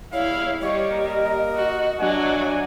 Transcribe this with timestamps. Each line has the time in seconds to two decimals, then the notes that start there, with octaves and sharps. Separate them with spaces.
0.13 E2 G3 E4 C#5 F5
0.62 G3 G4 C#5 D#5
0.91 A#3 A#4
1.56 F#4
2.00 F#3 D4 E5 F#5 G#5